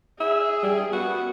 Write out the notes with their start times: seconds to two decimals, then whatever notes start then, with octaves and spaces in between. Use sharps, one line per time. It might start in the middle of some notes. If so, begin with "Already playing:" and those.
0.20 G#4 E5
0.63 G3
0.93 B3 F#4